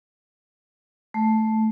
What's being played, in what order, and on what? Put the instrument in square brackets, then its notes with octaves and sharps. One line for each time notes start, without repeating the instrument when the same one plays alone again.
[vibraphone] A3